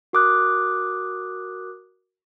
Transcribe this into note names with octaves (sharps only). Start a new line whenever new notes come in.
F#4 A#4 D6 D#6 F#6